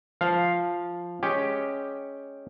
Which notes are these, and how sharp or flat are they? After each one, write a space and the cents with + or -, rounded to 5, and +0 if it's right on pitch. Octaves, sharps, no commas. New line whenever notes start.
F3 +0 F5 +0
G#3 +0 C#4 +0 G4 +0